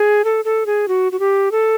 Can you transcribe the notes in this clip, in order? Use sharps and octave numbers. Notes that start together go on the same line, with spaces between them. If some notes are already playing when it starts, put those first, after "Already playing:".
Already playing: G#4
A4
A4
G#4
F#4
F#4
G4
A4